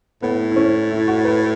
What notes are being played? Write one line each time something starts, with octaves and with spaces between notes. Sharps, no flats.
A2 B3
E4
C#4
E4
F#4
B4